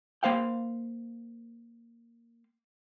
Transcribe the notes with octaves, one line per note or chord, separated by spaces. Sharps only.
A#3 C5 F5 G5